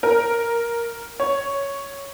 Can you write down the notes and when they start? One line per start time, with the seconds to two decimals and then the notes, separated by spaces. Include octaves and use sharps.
0.03 A#4
1.20 C#5